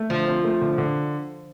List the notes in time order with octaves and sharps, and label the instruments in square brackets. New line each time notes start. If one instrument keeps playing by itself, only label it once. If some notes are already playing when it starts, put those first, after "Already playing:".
Already playing: [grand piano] A3
[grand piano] D3 [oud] F3
[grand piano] C4
A3
D3
D3